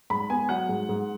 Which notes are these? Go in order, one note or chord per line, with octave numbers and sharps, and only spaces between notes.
G#2 B5
B3 G#5
F#3 F#5
G#2
G#2